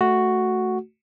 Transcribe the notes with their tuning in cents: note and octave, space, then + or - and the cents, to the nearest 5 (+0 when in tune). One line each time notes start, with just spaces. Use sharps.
A3 +0 F#4 +0